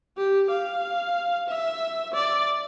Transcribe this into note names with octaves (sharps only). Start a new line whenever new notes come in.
G4
F5
E5
D5